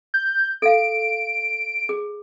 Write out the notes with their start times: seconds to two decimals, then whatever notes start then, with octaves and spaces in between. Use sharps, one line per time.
0.14 G6
0.62 A4 F5 D7
1.89 G#4